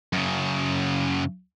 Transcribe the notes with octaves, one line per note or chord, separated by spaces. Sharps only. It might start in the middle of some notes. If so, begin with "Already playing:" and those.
F#2 C#3